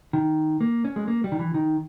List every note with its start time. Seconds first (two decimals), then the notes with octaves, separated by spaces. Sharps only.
0.13 D#3
0.61 A#3
0.84 C#4
0.96 G#3
1.08 A#3
1.24 G3
1.32 D#3
1.39 E3
1.54 D#3